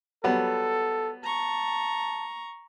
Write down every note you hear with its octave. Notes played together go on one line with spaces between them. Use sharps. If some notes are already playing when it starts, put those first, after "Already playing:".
F#3 G3 B3 A4
A5 A#5 C#6